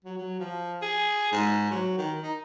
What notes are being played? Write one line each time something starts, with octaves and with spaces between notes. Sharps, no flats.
F#3
F#3
F3
G#4
G#2
F#3
D#3
D#4